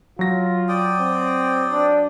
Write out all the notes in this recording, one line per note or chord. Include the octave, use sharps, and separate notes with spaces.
F#3 F4 A#6
D5 G5 D#6
C4
D4